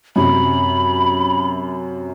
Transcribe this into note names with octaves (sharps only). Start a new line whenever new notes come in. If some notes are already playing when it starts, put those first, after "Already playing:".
F#2 C3 B5